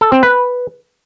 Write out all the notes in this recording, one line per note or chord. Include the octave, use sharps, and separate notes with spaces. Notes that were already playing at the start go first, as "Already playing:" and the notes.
A4
C4
B4